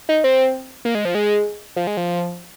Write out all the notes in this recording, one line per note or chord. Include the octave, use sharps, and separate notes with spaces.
D#4
C4
A#3
G#3
F3
G#3
F3
G#3
F3